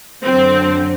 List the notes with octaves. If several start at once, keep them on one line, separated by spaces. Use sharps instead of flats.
F#2 D3 F#3 C4